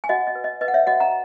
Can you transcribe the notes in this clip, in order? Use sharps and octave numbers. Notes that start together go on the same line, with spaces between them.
G#5
F#4 D#5 F#5
D#5
B4
D#5
B4 D#5
F#5
C#5 E5
F#4 D#5 F#5
F#5 A#5